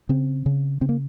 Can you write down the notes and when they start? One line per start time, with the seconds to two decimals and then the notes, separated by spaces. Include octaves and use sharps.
0.09 C#3 C4
0.46 C#3
0.81 C#3 C4
0.89 A#3